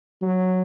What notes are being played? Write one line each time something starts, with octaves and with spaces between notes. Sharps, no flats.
F#3